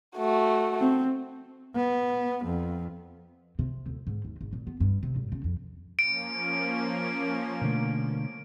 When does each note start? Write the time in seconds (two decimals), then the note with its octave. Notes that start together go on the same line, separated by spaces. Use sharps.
0.16 A3 F#4
0.80 C4
1.76 B3
2.45 F2
3.59 C3
3.86 D2
4.07 G#2
4.24 D#2
4.41 G#1
4.53 A#2
4.67 B3
4.80 G2
5.03 C3
5.16 G#1
5.32 C#3
5.44 F2
5.99 F3 A#3 C#4 D7
7.61 B2 D3 A3